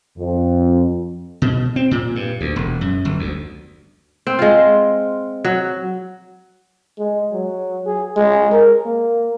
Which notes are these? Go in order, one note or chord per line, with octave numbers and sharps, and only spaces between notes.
F2
B2
C4
A#2
G2
D2
E1
F#2
G1
D2
C4
G#3 F4
F#3
G#3
F#3
G#4
G#3
A#4
A#3